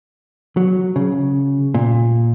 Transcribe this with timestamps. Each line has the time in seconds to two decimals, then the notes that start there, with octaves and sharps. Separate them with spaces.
0.57 F#3
0.96 C#3
1.74 A#2